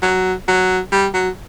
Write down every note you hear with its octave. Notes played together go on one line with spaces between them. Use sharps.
F#3
F#3
G3
F#3